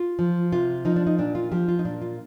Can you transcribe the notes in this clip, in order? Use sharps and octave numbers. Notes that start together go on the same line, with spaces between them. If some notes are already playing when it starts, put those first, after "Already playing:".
Already playing: F4
F3
C3 F4
F3 D#4
D4
D#4
A#2 D4
F4
F3 G4
F4
D#4
A#2 D4
F4